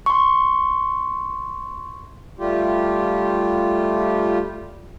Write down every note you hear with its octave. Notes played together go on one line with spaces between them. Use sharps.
C6 C#6
G3 A3 F4 G4